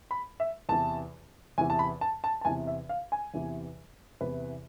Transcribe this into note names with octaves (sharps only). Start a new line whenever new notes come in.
B5
E5
E2 C3 E3 A5
E2 C3 E3 G#5
A5
B5
A5
A5
A5
E2 C3 E3 G#5
E5
F5
G#5
E2 C3 E3
E2 C3 E3 B4